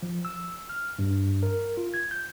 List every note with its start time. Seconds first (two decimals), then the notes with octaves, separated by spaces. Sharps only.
0.03 F3
0.25 E6
0.69 F6
0.99 G2
1.43 A#4
1.77 F4
1.94 G#6
2.11 G6